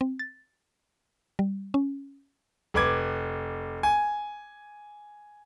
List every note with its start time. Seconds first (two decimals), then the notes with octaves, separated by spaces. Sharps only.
0.01 C4
0.19 A6
1.39 G3
1.74 C#4
2.74 F1 B4 D6 G#6
3.83 G#5